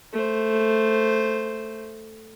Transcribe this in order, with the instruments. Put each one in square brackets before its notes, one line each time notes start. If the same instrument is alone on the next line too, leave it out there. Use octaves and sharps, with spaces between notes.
[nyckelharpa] A3 C5